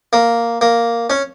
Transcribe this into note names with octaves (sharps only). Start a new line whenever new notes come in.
A#3
A#3
C#4